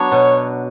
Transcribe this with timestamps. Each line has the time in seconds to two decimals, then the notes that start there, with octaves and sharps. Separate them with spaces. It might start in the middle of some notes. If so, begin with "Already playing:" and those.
Already playing: F#3 B3 D4 C#5
0.12 B2